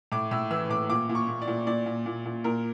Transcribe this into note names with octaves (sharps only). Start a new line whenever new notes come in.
A2 D6
A2 E6
E3 E6
A2 D6
A#2 D6
A#2
C#6
A#2
D5
A#2
A#2 D5
A#2
A#2
A#2
A#2 A#4